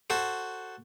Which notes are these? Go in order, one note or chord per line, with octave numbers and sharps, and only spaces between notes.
F#4 A4 C5